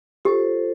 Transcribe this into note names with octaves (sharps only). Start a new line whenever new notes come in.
F4 G4 A4 C5